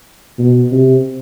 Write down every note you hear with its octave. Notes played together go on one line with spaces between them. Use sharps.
B2
C3